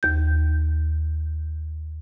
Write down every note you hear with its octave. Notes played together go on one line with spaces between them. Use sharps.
D#2 G6